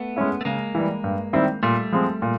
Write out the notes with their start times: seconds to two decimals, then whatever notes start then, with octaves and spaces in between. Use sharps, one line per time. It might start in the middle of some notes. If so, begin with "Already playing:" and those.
Already playing: A3 B3
0.16 G#3 C#4 E4
0.41 A3
0.45 C#3 G#3 A#3
0.75 E3 G3
1.04 G2
1.33 D#3 G3 C4 E4
1.63 A#2 G3 A3
1.92 F3 G#3 C4
2.22 A#2